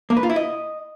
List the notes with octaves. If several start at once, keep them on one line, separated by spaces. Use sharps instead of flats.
A#3
B4
F4
E4
D#5